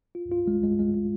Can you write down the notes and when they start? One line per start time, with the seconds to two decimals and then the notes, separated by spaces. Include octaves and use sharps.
0.15 F4
0.31 F4
0.47 G#3
0.63 G#3
0.79 G#3
0.94 G#3